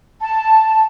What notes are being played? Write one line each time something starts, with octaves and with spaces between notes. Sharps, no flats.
A5